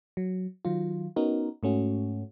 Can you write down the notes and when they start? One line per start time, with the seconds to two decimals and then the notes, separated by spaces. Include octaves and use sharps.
0.17 F#3
0.65 D#3 F#3 F4
1.16 B3 C#4 D#4 F#4 A#4
1.63 G#2 A3 C#4 F#4